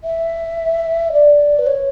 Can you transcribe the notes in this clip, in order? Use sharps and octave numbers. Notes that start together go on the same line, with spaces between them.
E5
D5
B4
C#5